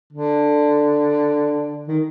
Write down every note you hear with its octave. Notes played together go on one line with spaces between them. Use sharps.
D3
D#3